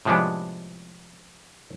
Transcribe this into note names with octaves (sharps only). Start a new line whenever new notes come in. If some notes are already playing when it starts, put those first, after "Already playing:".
A2 C3 F3 G#3 B3 D4